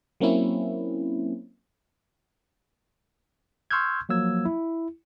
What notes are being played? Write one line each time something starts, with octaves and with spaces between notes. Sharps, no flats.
F#3 A#3 C4 C#4 E4
C6 C#6 E6 F6 G6 G#6
F3 F#3 A#3 E6 G#6
E4